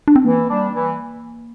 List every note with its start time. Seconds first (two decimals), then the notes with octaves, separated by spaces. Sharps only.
0.08 D4
0.16 C4
0.24 E3 A#3
0.49 G3 D4
0.74 E3